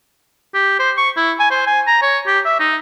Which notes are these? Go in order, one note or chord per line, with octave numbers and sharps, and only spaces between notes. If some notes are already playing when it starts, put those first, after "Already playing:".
G4
C5
C#6
E4
G#5
C5
G#5
A#5
C#5
G4
E5
D#4